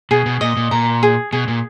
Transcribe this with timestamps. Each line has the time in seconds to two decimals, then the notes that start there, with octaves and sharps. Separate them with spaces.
0.11 B2 G#4
0.26 B2
0.41 A#2 D#5
0.57 A#2
0.71 A#2 A#5
1.03 G#4
1.32 B2 G#4
1.48 A#2